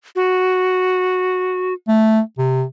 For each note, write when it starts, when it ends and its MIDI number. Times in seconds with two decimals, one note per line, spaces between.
0.16 1.73 66
1.88 2.20 57
2.38 2.64 48